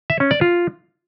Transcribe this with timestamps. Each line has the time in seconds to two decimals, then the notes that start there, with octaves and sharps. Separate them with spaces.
0.10 E5
0.20 C#4
0.31 D5
0.41 F4